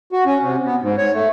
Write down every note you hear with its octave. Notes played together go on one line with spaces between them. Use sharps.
F#4
C#4
C3
B3
G#2
C#5
A3